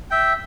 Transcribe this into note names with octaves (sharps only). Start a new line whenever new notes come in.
E5 G5